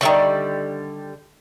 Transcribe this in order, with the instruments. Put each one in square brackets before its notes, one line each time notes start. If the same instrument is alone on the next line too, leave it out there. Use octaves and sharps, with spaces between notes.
[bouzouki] D3 G3 [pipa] D#3 E5 C#6